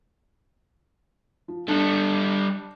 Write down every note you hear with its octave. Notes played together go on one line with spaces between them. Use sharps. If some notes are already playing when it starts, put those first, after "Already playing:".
F3
G3 D4 A4